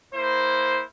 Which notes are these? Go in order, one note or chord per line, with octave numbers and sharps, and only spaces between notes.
A#3 E4 C5